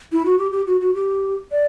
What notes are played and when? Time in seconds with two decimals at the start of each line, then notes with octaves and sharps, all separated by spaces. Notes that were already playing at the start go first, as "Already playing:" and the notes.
0.12 E4
0.25 F#4
0.38 G4
0.52 G4
0.67 F#4
0.81 F#4
0.95 G4
1.52 D5